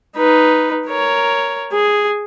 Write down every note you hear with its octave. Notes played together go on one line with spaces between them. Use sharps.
D#4 B4
A#4 C#5
G#4